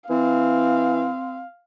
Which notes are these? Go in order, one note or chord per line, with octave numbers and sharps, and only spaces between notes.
E3 C4 F5